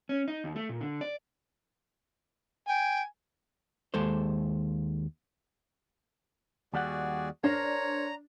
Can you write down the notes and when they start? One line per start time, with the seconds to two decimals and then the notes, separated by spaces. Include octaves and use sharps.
0.09 C#4
0.28 D#4
0.44 D#2
0.56 A3
0.69 A#2
0.81 D3
1.01 D5
2.68 G5 G#5
3.94 D#2 G#3 A4 C5
6.74 D#2 G3 F#4 G#4 D5 F#5
7.44 D4 A#4 C5 C#5 A#5